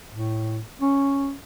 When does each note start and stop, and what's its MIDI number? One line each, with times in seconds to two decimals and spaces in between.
0.11 0.59 45
0.82 1.33 61